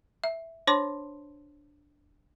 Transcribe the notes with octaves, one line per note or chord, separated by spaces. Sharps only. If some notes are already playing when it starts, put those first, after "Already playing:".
E5
D4 C5 C#5 A5 C6 D6